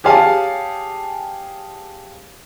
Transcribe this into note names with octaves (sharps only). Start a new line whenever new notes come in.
G4 G#4 C#5 F5 G#5 A5